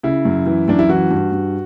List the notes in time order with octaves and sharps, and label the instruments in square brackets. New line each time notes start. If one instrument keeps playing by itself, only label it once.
[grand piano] C#3 E4
F#2
E3
F#2 D4
E4
E3 F#4
G2
G2